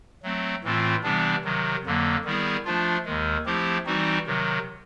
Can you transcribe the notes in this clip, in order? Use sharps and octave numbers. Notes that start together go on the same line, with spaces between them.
F#3 A3 C4
A2 E3 A3 C4 F4
C3 E3 G3 B3 D4
C3 D#3 F#3
F2 D3 F#3 A#3
D#3 G3 B3 E4 G#4
F3 A3 D4 F4
D#2 D#3 G#3
F3 A3 C4 E4 G4
E3 G3 C4 D#4 F#4
C3 D#3 F#3